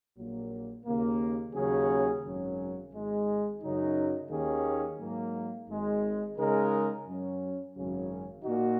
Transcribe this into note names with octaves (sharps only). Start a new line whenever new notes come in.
A#1 A#2 F#3 A#3
D#2 C#3 A#3
D#2 C#3 F#3 C#4 G#4
G#1 F#2 C#3 F#3 C#4
G#1 G#2 G#3
F#2 C#3 F#3 D#4
D#2 D#3 A#3 C#4 G#4
G#2 F#3 A#3
G#1 G#2 G#3
C#3 G#3 D#4 A#4
F#2 F#3 C#4
G#1 F#2 C#3 F#3 C#4
A#2 A#3 D#4 F#4